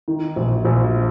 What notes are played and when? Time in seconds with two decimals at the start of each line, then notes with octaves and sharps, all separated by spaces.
0.08 D#3
0.36 A#1
0.65 A#1